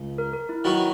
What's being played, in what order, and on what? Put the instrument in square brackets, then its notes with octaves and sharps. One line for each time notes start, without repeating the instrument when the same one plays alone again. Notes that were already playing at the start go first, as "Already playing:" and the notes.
Already playing: [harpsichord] C#2
[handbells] A#4
A#4
E4
[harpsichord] D#3 F#3 B3 F#4 [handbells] E4